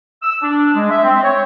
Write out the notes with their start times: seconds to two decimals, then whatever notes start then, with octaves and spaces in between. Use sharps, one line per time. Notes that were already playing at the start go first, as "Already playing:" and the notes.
0.23 E6
0.42 D4
0.74 G#3
0.90 E5
1.03 C4
1.23 C#5